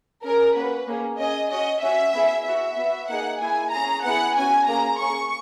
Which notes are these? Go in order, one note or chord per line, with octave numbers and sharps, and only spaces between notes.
C#4 G#4 A#4
A#3 C#4 F#4 B4
A#3 C#4 G#4
C#4 G#4 D#5
C#4 F#4 D#5
C#4 F#4 E5
B3 E4 G#4
B3 F#4 E5
B3 F#4
A#3 D#4 G#4 F#5
A#3 E4 G#4 G#5
C#4 G#4 A#5
B3 E4 G#4 F#5
C#4 F#4 G#5
A#3 C#4 G#4 A#5
A#3 C#4 G#4 C#6